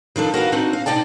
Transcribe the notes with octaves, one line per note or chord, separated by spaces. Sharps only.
D#3 F3 D4 A4
F#4 A#4 B4 F5
C4 D4 D#4 F#4
F5
B2 D#4 D5 G5 A5